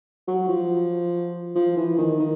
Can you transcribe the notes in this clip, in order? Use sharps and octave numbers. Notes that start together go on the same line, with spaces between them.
F#3
F3
F3
E3
D#3
D#3